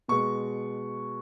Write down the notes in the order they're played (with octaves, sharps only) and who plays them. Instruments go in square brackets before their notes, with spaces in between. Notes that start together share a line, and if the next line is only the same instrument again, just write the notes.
[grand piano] B2 G#3 C#6